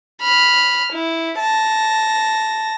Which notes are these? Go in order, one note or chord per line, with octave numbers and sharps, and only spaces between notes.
B5 F6
E4
A5 A#6